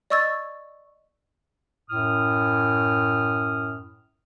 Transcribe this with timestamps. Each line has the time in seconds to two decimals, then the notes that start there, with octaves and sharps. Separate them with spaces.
0.10 D5 D#5 C#6 E6 G#6 A6
1.89 F#2 A2 D#6 F6